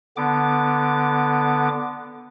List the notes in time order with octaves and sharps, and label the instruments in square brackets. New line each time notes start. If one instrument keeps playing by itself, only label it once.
[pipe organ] D3 B3 D6